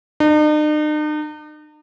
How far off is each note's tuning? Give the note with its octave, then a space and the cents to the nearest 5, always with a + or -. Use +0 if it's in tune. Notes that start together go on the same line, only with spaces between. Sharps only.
D#4 -45